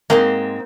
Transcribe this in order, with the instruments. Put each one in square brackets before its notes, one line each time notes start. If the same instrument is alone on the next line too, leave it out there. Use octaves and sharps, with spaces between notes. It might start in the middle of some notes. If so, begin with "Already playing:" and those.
[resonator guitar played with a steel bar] G#2 G#3 C4 [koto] A#3